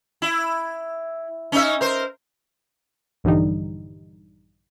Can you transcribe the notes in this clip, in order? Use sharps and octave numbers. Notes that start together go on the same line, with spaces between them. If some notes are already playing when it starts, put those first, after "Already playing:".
E4
C#4 D#4 E5
A#4 C5
A#1 G2 D3 E3 G3 D#4